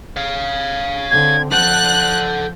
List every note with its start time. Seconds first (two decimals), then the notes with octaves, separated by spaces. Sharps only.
0.16 C#5 F5
1.11 D3 C4 G#6
1.52 F3 A4 F#5 F#6 G6